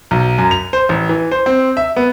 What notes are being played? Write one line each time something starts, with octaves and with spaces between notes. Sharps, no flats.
B1
F#2
F7
C5
A1
E3
C5
C4
E5
B3